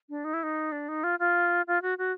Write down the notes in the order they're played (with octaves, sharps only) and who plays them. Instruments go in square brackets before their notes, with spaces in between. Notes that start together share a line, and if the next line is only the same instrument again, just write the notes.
[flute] D4
D#4
E4
D#4
D4
D#4
F4
F4
F4
F#4
F#4